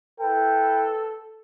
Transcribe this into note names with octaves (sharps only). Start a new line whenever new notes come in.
E4 A4 B4 G5